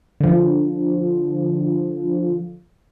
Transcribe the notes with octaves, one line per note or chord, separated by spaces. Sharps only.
D3 F3